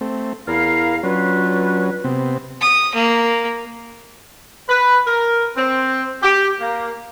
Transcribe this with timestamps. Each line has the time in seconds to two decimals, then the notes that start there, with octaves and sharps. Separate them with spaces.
0.01 A3 C4
0.48 E2 E4 A#4 F5
1.03 F#3 C#4 D4 F4 B4
2.04 C3 B3 C4
2.61 D#6
2.95 A#3
4.69 B4
5.07 A#4
5.57 C4
6.23 G4
6.60 A#3